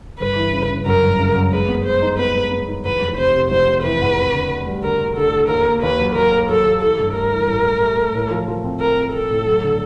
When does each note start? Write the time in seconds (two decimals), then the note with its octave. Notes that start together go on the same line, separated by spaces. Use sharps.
0.19 G1 B4
0.36 E3
0.53 C#3
0.69 C#3
0.86 F#2 A#4
1.03 G1
1.19 C#3
1.36 F#2
1.52 G#3 B4
1.69 B3
1.85 G#3 C5
2.02 D#4
2.19 B3 B4
2.35 G#3
2.52 B3
2.68 D#4
2.85 E2 B4
3.01 F1
3.17 C3 C5
3.34 C3
3.50 F1 C5
3.67 C3
3.84 E3 B4
4.01 E2
4.17 C4
4.34 D3
4.50 D2
4.66 G3
4.83 D3 A#4
5.00 D2
5.17 D3 A4
5.33 D3
5.49 D#2 A#4
5.66 A#3
5.82 D#2 B4
5.99 F#3
6.15 F#3 A#4
6.32 A#3
6.49 F#3 A4
6.66 D#2
6.81 E3 A4
6.99 G2
7.15 A3 A#4
7.32 E3
7.48 A1
7.65 A3
7.82 A3
7.97 A3
8.15 A2
8.31 F3
8.48 F3
8.64 C4
8.80 C4 A#4
8.97 C4
9.13 C4 A4
9.30 A2
9.47 F#3
9.64 D3